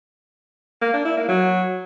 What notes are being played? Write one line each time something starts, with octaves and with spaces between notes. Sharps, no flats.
A#3
D4
E4
A#3
F#3